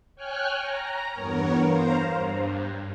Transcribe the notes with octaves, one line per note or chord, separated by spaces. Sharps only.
C#5 G5 G#5 F6 F#6
A#5
E2 G2 B3 A#4 C#5
C5 F5 A#5
G2